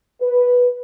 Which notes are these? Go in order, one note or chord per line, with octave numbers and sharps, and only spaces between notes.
B4